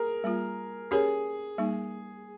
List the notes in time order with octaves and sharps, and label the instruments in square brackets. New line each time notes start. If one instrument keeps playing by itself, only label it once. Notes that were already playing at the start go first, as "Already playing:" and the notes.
Already playing: [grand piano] G#4 A#4
[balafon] G3 A#3 F4
[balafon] C#4 G4 A#4 C#5 [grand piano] G#4
[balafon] G3 A#3 D#4